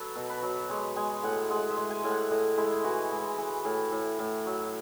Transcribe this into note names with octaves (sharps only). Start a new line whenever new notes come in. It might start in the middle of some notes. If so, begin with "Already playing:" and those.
Already playing: F#3 A4 B4
B2
B4
F#3
G#3 C#5
G#3 G#5
A2 F#5
G#3 F#5
E5
G#3
G#5
A2
F#5
A2 D#5
G#3 E4
E3 F#4
G#3
E3
A2
A2
A2
F#3